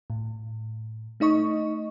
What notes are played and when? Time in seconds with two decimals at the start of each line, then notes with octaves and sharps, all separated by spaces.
0.10 A2
1.20 A3 D#4 D#5 C#6